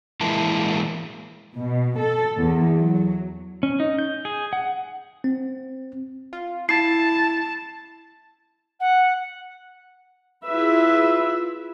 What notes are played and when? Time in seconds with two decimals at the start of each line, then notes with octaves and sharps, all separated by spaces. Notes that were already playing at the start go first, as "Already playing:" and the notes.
0.21 E3 G#3 A#3 E4 A5
1.55 B2
2.01 A4
2.38 E2
2.78 F#3
3.63 C#4
3.80 D#4
3.99 G6
4.25 G#4
4.53 F#5
5.24 C4
6.33 F4
6.69 E4 A5 C7
8.80 F#5
10.47 E4 F4 G#4 B4 E5